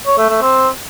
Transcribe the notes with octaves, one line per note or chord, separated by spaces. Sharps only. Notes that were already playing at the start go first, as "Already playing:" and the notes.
C#5
A3
A3
C4